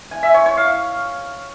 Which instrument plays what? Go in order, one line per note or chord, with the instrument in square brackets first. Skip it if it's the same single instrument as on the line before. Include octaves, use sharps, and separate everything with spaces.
[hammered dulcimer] G#5
E5
C#5
C#5
F5